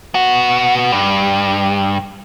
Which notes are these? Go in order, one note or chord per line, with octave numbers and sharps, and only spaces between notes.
B3 F#4
G2